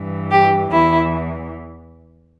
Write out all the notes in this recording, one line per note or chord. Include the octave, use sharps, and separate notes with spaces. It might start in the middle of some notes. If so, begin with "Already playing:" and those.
Already playing: G2 E3
G4
E2 E3 E4